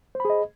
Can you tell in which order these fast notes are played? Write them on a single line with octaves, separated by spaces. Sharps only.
C5 B5 G#4 D#5